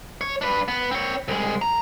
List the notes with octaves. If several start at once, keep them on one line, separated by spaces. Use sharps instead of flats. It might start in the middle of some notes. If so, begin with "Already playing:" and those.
C#5
D4 B4
B3
C4 C#5
C2 G#3
A#5